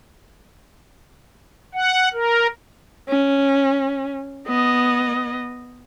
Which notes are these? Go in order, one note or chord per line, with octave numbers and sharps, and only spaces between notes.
F#5
A#4
C#4
B3 D#5